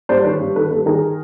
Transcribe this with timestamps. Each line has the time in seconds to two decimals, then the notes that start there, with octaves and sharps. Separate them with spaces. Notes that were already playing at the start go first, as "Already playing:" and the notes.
0.09 G2 C5 D5
0.24 D#3 B4 C#5
0.40 G2
0.55 D#3 A4 B4
0.71 G2 A4 B4
0.86 D#3 G#4 A#4